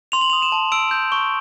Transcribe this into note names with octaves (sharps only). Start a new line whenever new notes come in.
C6 F7
F#7
D#6 F7
E7
A5
E6 D7
G6
C#6